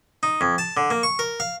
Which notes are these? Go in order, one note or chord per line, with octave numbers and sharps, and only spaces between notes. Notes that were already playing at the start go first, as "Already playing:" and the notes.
D#4
F2
A5
D3
A#3
C#6
A#4
F5